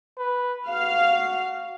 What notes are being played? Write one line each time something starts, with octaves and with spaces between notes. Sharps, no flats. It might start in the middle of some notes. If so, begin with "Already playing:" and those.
B4
F#4 F5